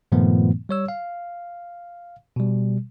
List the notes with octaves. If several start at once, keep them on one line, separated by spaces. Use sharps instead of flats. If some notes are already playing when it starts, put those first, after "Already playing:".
G2 A#2 D#3 F3 A3 B3
G3 C#5 E6
F5
B2 G3